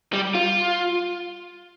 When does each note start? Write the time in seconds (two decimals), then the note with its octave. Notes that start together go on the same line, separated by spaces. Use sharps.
0.13 G3
0.35 F4